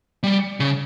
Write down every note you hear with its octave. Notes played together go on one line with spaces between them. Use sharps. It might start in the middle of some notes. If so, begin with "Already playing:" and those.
G3
C#3